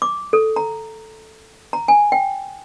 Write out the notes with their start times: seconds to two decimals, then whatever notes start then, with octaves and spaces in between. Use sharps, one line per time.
0.02 D6
0.33 A4
0.56 A#5
1.73 A#5
1.88 G#5
2.12 G5